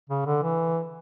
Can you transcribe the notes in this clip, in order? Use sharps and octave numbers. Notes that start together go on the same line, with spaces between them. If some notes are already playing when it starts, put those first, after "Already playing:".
C#3
D3
E3